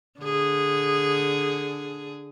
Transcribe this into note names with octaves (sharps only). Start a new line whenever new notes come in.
D3 G#4